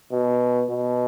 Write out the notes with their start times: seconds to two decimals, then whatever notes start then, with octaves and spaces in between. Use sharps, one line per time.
0.12 B2
0.70 B2